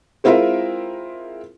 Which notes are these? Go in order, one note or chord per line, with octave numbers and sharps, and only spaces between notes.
G#3 C4 E4 F4 A#4 E5